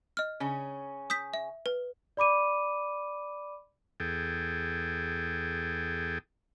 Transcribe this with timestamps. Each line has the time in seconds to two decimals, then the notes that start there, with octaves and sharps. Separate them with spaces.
0.17 D#5 F6
0.40 C#3 C#4
1.10 D#6 G6 B6
1.34 E5
1.66 B4
2.17 D5 B5 D6 D#7
4.00 E2 G#4 A4 G5